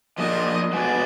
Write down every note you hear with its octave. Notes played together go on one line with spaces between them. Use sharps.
F3 A#3 D4 D#5
G#3 B3 D4 F#4 D5